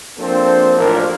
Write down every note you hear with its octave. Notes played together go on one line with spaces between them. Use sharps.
F3 A#3 C4 D4 A4 C5
A1 F3 D4 F4 A#4